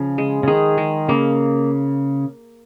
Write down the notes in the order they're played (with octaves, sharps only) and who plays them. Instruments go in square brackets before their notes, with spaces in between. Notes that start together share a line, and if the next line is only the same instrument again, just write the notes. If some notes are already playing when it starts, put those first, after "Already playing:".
Already playing: [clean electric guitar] C#3 [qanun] F3
[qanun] G#3
[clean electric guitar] C#3
[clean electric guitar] D#3 [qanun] G#4
[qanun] G#3
[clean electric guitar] C#3 [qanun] A#3